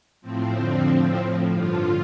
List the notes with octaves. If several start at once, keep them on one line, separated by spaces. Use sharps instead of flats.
A2 F3 C4
F2 D3 F3
A2 F3
A2 F3
G2 D3 F3 F4